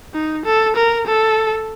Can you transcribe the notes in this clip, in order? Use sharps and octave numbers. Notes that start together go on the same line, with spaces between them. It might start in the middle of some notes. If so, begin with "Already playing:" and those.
D#4
A4
A#4
A4